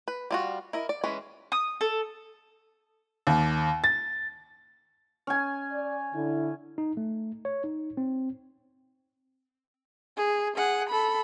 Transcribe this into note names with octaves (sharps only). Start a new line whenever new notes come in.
B4
G3 F4 F#4
E4 A#4 D#5
D5
E3 G#3 C#4 B4
D#6
A4
D#2
A6
C#4 G#5
D5
D3 E4
D#4
A3
C#5
D#4
C4
G#4
G#4 F#5
A4 B5